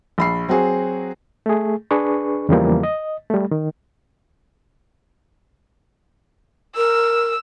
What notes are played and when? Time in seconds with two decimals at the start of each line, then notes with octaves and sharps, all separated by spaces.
0.18 A#1 B5 C7
0.48 F#3 C4 F#4 G#4
1.46 A3 G#4
1.91 D4 G#4 B4 C#6
2.49 E2 C#3 E3 F3 G3 A#3
2.83 D#5
3.30 G3 A3
3.51 D#3
6.77 A#4 E6